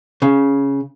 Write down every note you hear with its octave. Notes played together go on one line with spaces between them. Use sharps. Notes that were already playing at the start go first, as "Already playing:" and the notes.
C#3